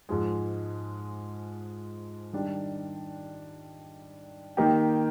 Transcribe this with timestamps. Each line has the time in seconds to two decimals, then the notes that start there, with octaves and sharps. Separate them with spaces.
0.09 G#2 F3 G#3
2.33 D#3 G3 D4
4.57 D#3 A#3 D#4 G4